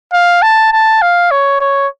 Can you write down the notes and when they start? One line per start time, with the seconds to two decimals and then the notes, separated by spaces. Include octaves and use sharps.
0.13 F5
0.42 A5
0.73 A5
1.02 F5
1.31 C#5
1.61 C#5